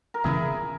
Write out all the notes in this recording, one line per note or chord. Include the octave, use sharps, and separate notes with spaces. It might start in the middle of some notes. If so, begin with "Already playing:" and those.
A#4
C#3 E3 B3 E4 G#4